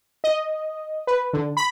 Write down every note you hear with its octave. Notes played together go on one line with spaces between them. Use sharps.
D#5
B4
D3
B5